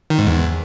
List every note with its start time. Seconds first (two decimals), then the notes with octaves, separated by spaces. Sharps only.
0.10 D#3
0.19 G#2
0.27 E2